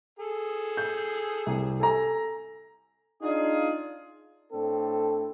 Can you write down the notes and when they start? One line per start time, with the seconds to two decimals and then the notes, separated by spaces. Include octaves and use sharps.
0.19 G#4 A4
0.77 G6
1.46 C2
1.80 A4 G#5 A#5
3.21 D4 D#4 F4 G#4
4.51 A2 C4 D4 A4